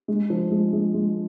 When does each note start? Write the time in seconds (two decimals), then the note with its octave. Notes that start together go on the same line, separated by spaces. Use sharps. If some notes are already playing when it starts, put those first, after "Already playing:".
0.08 G#3
0.30 F3
0.51 G#3
0.73 G#3
0.94 G#3